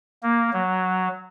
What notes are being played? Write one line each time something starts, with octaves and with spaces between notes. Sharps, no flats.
A#3
F#3